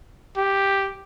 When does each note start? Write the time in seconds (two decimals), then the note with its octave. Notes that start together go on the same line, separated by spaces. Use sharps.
0.37 G4